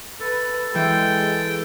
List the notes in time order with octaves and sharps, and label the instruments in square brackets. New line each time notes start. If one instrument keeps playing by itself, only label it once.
[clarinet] A4 [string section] B4
[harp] E3 [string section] G#3 [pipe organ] G5